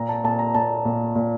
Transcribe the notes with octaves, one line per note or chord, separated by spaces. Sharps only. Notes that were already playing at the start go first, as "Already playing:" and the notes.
Already playing: A#2 A#5
A5
A#2 A5
A#5
A#2 A5
A#2
A#2